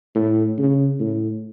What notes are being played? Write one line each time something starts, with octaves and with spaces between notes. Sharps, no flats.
A2
C#3
A2